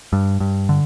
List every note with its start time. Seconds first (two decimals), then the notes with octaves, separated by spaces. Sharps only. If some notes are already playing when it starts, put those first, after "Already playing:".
0.13 G2
0.40 G2
0.69 D3